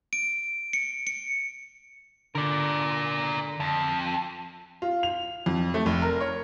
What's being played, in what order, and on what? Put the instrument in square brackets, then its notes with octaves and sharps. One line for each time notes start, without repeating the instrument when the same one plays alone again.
[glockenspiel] D7
C#7
C#7
[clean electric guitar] D3 [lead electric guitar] A#4 D5
[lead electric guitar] F2
[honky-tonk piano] F4
F7
F2
A3
F1
A#4
C#5